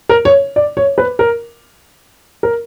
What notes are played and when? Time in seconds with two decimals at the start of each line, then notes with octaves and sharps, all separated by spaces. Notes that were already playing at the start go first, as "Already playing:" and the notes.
0.09 A#4
0.25 C#5
0.56 D5
0.77 C#5
0.98 B4
1.19 A#4
2.43 A#4